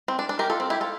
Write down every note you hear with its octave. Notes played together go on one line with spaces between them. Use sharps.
C4
D4
D4
G4 A#4
F4 A4
C4
E4 G4
F4 A4